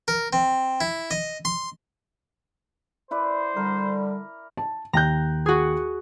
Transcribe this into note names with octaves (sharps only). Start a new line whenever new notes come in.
A#4
C4
E4
D#5
C6
E4 B4 C5 D5
D3 G3 A#4
A5
D#2 G5 A#5 F#6 G6
F#4 G#4